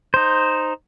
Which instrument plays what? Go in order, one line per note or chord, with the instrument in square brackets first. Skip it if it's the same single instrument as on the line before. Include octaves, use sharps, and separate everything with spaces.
[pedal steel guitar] D#4 C5